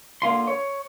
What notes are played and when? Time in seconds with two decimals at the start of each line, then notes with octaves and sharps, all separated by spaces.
0.22 D3 A#3 F4 C6
0.47 C#5